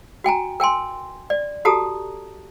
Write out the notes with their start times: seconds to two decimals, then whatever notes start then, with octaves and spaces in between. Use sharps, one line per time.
0.24 F#4 G5 G#5 A#5
0.60 A#4 G5 G#5 C6
1.30 D5
1.65 F#4 G4 A4 A5 A#5 D#6